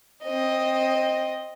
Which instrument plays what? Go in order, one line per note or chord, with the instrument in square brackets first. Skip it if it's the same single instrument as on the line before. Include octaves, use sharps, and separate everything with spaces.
[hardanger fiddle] C4 D#5